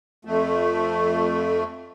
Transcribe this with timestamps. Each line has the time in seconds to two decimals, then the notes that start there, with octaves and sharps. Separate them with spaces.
0.25 F2 A3